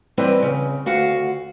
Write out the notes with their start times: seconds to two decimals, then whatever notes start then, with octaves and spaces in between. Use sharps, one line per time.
0.17 E3 G3 C4 E4 B4 D#5
0.42 C#3
0.86 D2 F#4 F5 F#5